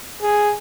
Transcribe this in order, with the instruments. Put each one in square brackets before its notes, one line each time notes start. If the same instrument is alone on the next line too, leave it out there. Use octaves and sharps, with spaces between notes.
[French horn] G#4